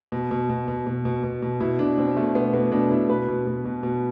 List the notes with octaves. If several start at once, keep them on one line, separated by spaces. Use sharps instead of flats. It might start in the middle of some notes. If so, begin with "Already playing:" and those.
B2
B2
B2
B2
B2
B2
B2
B2
B2 E4
B2 D4
B2 C4
B2 A3
B2 B3
B2 B3
B2 D4
B2 E4
B2 B4
B2
B2
B2
B2